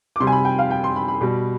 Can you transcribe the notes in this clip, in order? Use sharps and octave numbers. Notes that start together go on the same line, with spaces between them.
D6
C3 G3 C6
G#5
B5
G5
F5
G5
C6
B5
B5
B2 G3